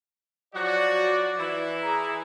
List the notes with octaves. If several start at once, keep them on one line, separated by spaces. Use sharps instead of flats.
F3 F#3 F#4 D5
E3 E4
G#4 A#5